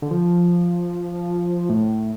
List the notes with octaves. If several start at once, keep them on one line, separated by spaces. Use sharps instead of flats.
D3
F3
A2